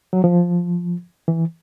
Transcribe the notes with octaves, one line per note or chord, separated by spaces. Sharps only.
F#3
F3
E3